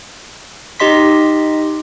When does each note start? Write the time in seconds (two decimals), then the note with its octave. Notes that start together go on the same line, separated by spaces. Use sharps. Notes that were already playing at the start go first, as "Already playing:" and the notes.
0.80 D#4 G4 D#5 C6 B6